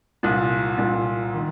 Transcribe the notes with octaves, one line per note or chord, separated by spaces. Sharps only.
C2 A#2
C2 A#2
D#3